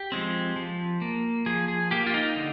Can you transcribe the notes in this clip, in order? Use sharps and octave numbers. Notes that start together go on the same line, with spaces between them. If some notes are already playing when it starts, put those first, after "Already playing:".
Already playing: G4
F3 G#3 C4
F3
A#3
F3 G#4
G#4
A#3 G4
F4
D#4
D3